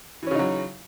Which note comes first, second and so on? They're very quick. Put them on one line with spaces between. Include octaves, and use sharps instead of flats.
E3 C#4 C#3 D#4 F#3